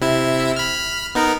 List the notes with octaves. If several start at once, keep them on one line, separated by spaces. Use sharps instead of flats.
C3 E4 E5
B5 F6
B3 D#4 A#4